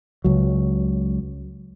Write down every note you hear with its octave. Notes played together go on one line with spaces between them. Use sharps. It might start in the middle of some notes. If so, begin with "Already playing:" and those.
C#2 F#3